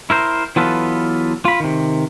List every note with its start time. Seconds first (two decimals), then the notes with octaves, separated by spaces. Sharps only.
0.10 E4 A#4 C5
0.56 E3 F#3 B3 F4 A4 B4
1.45 F4 B5
1.60 C3 D#3